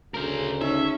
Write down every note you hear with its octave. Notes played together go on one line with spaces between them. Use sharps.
D2 C#3 A#4 C5
C#4 D#4 E5